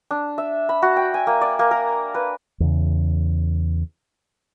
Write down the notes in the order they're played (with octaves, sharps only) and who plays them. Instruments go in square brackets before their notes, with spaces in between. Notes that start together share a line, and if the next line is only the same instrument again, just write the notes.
[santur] D4
E5
B5
F#4
G5
G#5
A#3
D5
A#3
A#4
B4
[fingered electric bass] E2 C#3